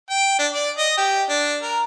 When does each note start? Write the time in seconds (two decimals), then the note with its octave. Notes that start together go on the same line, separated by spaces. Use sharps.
0.10 G5
0.39 D4
0.52 D5
0.77 D#5
0.97 G4
1.29 D4
1.62 A#4